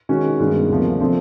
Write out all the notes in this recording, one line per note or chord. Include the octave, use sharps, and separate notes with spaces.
D#3 G#3 C#4 F#4
G2 D#3 G#3 B3
D2 C3 F3 A#3
D3 F3 A3 C4